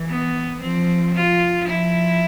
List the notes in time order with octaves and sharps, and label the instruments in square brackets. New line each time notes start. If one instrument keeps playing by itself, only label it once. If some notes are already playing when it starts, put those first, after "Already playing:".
Already playing: [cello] E3
[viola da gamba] B3
[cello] F3 [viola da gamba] C4
[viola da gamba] F4
[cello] F3 [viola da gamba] E4